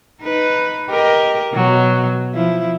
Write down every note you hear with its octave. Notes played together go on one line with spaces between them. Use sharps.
D#4 B4
G4 A#4 D#5
B2 F#3
F3 E4